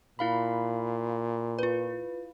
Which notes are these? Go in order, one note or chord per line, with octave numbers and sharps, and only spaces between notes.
A#2 E4 F5 B5
F4 B4